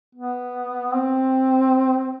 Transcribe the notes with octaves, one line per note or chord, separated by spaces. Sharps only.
B3
C4